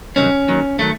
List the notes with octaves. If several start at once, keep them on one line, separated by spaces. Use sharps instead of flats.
C2 C3 D#3 F#3 C#4
D#2 D#3 F#3
D#3 F#3 A3